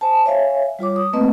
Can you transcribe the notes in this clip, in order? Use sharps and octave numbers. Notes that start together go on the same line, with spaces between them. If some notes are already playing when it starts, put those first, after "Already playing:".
C5 G#5 A5
C#5 E5 F5 G#5
G3 F4 C#5 D6
D#6
A3 A#3 C4 B4 D#5